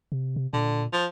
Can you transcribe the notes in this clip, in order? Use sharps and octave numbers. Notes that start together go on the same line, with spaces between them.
C3
C3
A#2 D3
F3